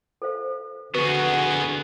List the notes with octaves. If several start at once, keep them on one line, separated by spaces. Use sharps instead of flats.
A4 C5 F5
D3 B3 F#4 G#4 B4